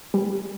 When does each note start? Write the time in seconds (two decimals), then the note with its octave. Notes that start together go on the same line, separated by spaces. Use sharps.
0.14 G3